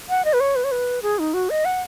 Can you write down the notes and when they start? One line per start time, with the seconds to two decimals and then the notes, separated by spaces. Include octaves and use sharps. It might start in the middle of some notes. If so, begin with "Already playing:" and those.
0.09 F#5
0.25 D#5
0.33 B4
0.40 C#5
0.56 B4
0.64 C#5
0.72 B4
1.02 G#4
1.19 D#4
1.34 F#4
1.50 D#5
1.65 F#5